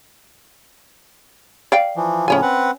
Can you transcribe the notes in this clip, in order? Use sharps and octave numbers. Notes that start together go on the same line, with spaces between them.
D5 F5 G5
E3 F3
A2 C#3 F3 C#4 C#5 G#5
C4 B4 F#5